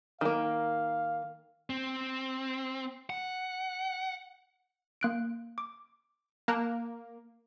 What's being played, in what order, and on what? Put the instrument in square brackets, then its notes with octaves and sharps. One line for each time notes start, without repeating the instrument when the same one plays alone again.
[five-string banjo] D#3 A#3 [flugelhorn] F5
[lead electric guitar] C4
F#5
[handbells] A#3 F#6 D7
D6
[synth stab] A#3 [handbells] A5 F#6